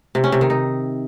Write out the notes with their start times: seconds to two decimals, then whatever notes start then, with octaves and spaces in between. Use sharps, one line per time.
0.15 C3
0.24 C#4
0.32 C3
0.41 D#3
0.50 D#4